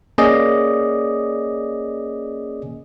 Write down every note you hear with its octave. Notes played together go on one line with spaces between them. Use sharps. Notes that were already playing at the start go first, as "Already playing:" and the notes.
A#3 C#4 G#4 D5 D#5